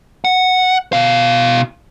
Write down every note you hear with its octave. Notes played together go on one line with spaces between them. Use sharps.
F#5
B2 F5